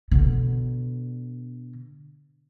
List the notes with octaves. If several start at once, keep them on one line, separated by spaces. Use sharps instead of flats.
B2 D3